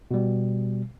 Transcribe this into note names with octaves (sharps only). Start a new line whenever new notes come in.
B2 G3